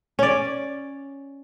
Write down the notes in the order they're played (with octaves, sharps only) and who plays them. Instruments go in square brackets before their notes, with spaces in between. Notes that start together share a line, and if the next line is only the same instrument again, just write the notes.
[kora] C#4 D5